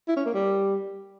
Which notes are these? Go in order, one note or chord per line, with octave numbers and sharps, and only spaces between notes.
E4
C#4
A#3
G3